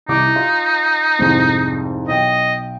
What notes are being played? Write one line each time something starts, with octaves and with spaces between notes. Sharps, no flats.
C2 D#4 E4 D6
F4
C2 F2 G#2
B1 D#5 G5